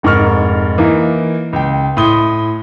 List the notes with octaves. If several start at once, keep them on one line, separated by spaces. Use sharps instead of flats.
F1 G#2 A#4 C#6 F6
E3 A#3 D#4
C#2 G5
A2 C6 D#6 G7